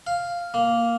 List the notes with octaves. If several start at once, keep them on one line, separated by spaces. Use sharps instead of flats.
F5
A#3